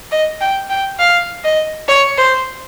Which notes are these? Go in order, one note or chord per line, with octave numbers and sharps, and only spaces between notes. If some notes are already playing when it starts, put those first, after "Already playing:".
D#5
G5
G5
F5
D#5
C#5
C5